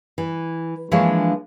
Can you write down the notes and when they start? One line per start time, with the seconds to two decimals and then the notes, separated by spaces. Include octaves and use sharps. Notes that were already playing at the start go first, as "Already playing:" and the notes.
0.18 E3
0.91 E3 F3 G#3 A#3 D4 C#5